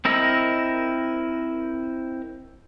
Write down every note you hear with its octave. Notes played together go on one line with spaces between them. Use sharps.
C4 E4 A#4 D#5 E6